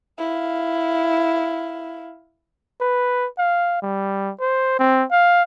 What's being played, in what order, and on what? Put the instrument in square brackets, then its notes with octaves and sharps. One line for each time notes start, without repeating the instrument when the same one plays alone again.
[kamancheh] E4 F5
[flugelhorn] B4
F5
G3
C5
C4
F5